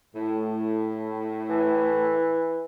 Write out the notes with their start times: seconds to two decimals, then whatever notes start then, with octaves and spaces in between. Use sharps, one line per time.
0.15 A2
1.50 E3